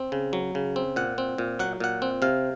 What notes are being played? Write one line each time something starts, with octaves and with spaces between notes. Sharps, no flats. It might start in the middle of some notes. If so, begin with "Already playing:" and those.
Already playing: C4
C#3
F#3
C#3
C4
A#2 F#5
C4
A#2
F#3 F#5
A#2 F#5
C4
C3 F5